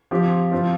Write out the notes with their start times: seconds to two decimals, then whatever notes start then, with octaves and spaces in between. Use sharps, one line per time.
0.11 F3 C4 G4
0.52 F3 C4 F4